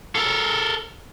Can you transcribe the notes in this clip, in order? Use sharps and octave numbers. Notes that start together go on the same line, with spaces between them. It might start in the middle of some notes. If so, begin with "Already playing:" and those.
A4 A#4